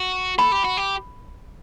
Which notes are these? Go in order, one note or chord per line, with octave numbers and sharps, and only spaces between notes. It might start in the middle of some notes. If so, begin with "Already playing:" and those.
Already playing: F#4
A4 B5
G4
F#4
G4